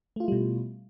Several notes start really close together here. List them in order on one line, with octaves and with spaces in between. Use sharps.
A3 F4 E4 G3 B2